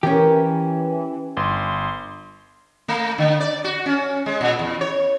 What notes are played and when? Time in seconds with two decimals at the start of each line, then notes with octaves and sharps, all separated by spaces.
0.03 E3 C#4 G4 A#4 C#5
1.37 G1 C6
2.88 A3
3.18 D3
3.40 D5
3.64 F#4
3.86 C#4
4.26 G#3
4.41 A#2
4.59 E2
4.81 C#5